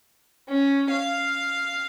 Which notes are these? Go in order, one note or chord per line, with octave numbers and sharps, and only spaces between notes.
C#4
F5